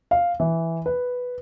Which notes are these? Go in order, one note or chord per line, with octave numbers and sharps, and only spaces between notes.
F5
E3
B4